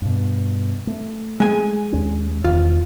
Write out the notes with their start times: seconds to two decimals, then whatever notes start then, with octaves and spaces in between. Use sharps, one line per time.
0.02 G2 B2
0.87 A3
1.40 G#3 G#5
1.92 D#2 C#4
2.44 E1 E2 D#3 F4